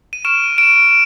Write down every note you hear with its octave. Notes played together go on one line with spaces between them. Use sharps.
D#7
C#6 F6 D7 E7
D7 E7